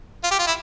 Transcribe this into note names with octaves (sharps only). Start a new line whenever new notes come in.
F4
G4
F4
E4